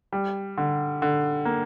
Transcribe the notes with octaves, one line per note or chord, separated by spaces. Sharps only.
G3
D3
D3
A#3